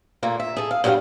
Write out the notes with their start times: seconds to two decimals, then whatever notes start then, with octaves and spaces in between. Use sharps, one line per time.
0.23 A#2 A3 A#3
0.40 E5
0.57 G#4 A4
0.71 F5
0.84 G2 F#3 G3 B4 F5 G5